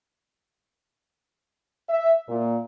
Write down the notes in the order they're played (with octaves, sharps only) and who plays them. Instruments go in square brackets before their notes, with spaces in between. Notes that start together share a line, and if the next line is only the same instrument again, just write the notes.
[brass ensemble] E5
A#2